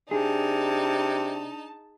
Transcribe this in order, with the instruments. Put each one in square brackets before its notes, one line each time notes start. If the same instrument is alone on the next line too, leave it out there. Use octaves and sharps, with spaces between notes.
[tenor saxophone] C3 [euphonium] D4 [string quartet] D#4 A5 [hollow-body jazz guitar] G#4